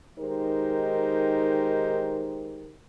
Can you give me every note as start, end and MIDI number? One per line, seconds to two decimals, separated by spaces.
0.19 2.77 51
0.19 2.77 56
0.19 2.77 63
0.19 2.77 67
0.19 2.77 70
0.19 2.77 72